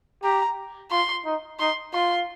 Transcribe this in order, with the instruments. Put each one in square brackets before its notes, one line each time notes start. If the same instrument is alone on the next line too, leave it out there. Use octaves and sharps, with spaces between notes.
[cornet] G4 [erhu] A#5
[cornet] F4 [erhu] C6
[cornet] D#4
[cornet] D#4 [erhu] C6
[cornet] F4 [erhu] C6